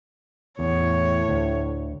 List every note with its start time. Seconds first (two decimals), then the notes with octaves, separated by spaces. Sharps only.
0.59 E2 A2 C#5
1.29 D2